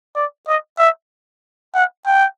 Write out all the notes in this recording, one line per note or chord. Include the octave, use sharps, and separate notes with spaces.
D5
D#5
E5
F#5
G5